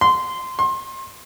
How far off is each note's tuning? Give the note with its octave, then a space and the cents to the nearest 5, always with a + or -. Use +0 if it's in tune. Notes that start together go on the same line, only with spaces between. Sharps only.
C6 -15
C6 +30